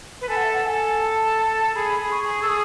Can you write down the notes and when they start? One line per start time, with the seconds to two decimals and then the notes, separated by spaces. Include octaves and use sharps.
0.21 B4
0.29 A4 G#5
0.36 F#5
0.44 E5
0.52 F#5
0.65 A4 G#5
1.01 A5
1.75 G#4 B5
2.00 G#4
2.11 C#6
2.24 G#4
2.41 A4 E6
2.48 G#4 D#6